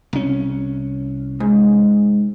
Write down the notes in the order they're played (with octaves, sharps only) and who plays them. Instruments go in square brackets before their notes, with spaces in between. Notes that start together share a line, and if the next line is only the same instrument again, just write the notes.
[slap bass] C2 C#4
[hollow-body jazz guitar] G#2